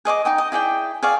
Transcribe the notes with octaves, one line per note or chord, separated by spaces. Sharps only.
G#4 D#5 C#6 D6
D#4 G5 D#6
D#5
E4 G#4 D5 G5
G#4 C#5 D5 F5